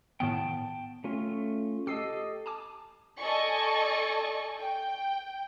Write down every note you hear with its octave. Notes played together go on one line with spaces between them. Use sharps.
A2 D#3 B3 G5 A5
A3 C#4 F4
G4 A4 D#5 E6 C7
G#5 A5 D6
A4 D5 D#5 G#5 C#6
G5